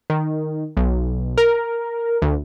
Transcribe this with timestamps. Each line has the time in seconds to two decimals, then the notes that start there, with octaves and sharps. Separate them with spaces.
0.10 D#3
0.77 B1
1.38 A#4
2.22 D2